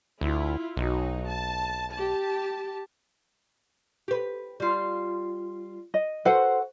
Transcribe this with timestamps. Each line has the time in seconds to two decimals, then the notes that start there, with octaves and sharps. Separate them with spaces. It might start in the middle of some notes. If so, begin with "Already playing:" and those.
0.21 D2 E4 F4
0.77 B1 F#3 D#4
1.28 A5
1.93 G4 A5
4.08 G4 B4
4.60 G3 F4
5.94 D#5
6.25 F#4 A4 B4 C5 F#5